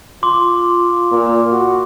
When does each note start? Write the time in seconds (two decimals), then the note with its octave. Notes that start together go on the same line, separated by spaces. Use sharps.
0.23 F4 C6 D6
1.11 A#2
1.52 F#4